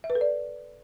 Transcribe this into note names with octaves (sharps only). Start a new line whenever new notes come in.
E5
B4
A4
D5